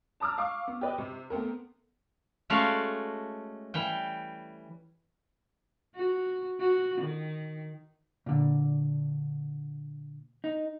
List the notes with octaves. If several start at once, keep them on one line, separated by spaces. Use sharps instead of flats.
A5 A#5 D6 E6 F6
F5 C#6 D6
B3
G4 B4 D#5
C3
A3 B3 C4 A#4
G#3 A3 C#4 F#4 D5 F5
E3 G3 G5
F#4
F#4
D#3
A#2 D3
D#4